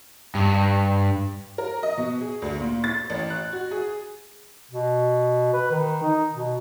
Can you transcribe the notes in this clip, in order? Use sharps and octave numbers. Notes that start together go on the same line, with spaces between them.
G2
A#4
D#5
B2
G#4
D2
A#2
A6
A1
F#6
F#4
G#4
B2
B4
D#3
D#4
B2